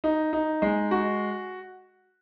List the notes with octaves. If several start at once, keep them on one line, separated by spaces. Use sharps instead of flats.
D#4
D#4
G#3
F#4